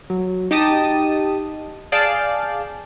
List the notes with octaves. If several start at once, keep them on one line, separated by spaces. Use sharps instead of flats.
F#3
D#4 G4 A5 D#6
G#4 D5 F5 G5 A5